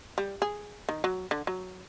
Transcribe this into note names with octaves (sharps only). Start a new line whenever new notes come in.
G3
G#4
D#3
F#3
D3
F#3